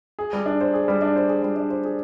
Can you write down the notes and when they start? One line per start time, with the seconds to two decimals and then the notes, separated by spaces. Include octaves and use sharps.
0.19 G#4
0.33 G3
0.46 D4
0.61 C5
0.74 G#4
0.88 G3
1.02 D4
1.16 C5
1.29 G#4
1.43 G3
1.56 D4
1.70 C5
1.85 G#4